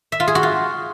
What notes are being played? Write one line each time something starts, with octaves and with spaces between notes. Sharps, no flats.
E5
F4
G#4
F#4
F4